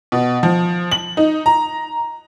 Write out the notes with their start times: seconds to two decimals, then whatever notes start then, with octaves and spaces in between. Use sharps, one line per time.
0.12 B2
0.43 F3
0.92 F#7
1.17 D#4
1.46 A#5